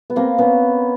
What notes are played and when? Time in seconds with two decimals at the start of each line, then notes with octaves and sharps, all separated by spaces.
0.10 B3
0.16 A#3 C4
0.38 B3 C#4